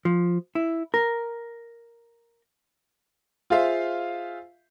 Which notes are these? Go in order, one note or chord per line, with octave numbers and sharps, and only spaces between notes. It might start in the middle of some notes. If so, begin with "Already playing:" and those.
F3
E4
A#4
F4 G#4 C5 E5 F5